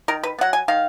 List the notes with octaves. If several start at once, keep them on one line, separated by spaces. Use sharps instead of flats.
D#3 A#4
B4
B3
F#3 F#5
G#5
D#3 F5